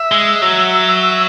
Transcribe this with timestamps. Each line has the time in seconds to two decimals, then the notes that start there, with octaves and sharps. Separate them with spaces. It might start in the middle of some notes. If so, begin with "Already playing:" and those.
Already playing: E5
0.12 G#3
0.42 F#3